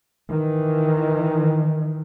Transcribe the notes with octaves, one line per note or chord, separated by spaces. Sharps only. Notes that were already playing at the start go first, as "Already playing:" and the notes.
D#3 E3